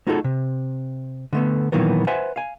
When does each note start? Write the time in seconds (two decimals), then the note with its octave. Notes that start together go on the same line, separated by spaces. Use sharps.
0.07 A3 D#4 F4 F#4 G#4 A4
0.24 C3
1.33 D3 A3 B3
1.72 A#2 D#3 E3 F#3 A#3 B3
2.07 B4 C5 E5 F#5 G#5
2.36 F5 G#5